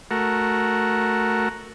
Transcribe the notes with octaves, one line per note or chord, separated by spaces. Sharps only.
A3 F#4 A#4